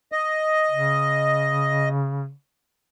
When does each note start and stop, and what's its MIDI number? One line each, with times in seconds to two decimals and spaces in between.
0.12 1.89 75
0.71 2.31 49